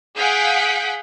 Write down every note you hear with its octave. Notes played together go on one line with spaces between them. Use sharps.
G#4 F5 F#5 G6 B6 D7